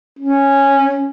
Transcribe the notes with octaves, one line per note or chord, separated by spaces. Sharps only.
C#4